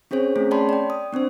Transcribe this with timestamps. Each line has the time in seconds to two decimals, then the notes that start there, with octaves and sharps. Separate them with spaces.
0.11 C4 C#4 G#4 C5 C#5
0.36 A3 C4 C#4 G#4
0.51 C#5 D5 G5 A5 B5 C6
0.69 D5 G5
0.90 D#6
1.13 B3 C4 D4 C5